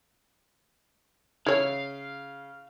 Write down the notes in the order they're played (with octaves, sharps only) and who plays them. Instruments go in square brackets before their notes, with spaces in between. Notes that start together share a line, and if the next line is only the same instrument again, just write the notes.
[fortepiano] C#3 [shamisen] E4 C#5 [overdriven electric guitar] F5